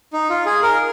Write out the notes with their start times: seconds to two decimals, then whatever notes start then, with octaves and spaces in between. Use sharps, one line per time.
0.13 D#4
0.30 F4
0.46 G#4
0.63 A#4